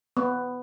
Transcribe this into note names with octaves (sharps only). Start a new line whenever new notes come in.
B3